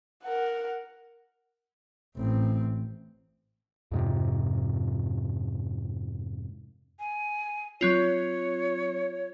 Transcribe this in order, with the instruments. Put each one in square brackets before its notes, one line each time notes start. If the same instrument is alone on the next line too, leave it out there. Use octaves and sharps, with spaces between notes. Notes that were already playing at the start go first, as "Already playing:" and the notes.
[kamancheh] A#4 F#5
[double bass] A1 C4
[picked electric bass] F2 G#2 C3
[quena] G#5
[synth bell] F#3 C4 F4 [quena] C#5